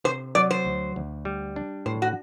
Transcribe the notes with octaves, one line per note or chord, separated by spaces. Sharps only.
C3 C5
F#3 D5
C5
D2
D2
G3
D4
A2 C5
F#4